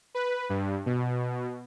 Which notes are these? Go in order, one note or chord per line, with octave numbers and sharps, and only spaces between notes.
B4
G2
B2